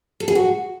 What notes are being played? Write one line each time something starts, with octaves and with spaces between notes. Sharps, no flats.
A4
G#4
F#4